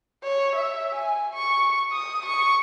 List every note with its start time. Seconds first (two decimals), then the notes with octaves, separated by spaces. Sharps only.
0.23 C#5
0.55 E5
0.95 G#5
1.34 C#6
1.92 D#6
2.26 C#6